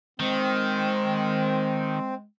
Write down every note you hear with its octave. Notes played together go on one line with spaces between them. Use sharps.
D#3 G#3 C4